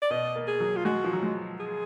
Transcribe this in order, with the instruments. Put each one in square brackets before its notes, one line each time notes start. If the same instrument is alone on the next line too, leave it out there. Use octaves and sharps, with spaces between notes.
[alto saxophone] D5
[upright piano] B2 [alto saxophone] D#5
[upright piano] A#3
[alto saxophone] G#4
[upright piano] F#3
[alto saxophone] F4
[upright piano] G#3 [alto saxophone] F#4
[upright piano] F3
F#3
G#3
[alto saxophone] G#4